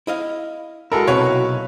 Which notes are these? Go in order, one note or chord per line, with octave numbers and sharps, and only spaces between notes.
E4 D#5 F5
G#3 E4 F#4 A4 A#4
B1 C3 B4 C#5 F5